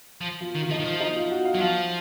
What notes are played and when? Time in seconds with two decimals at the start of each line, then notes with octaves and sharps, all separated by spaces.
0.21 F3
0.41 F4
0.56 D#3
0.62 F4
0.70 F3 D#4
0.80 D#3
0.85 F3
1.00 D#4
1.16 F4
1.31 F#4
1.45 F5
1.55 F#3
1.61 F3 F5